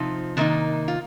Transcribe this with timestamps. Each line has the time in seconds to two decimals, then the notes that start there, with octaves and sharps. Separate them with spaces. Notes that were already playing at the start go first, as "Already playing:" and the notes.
Already playing: C3 F3 C4 D#4
0.37 C3 D#3 A#3 D#4
0.88 F4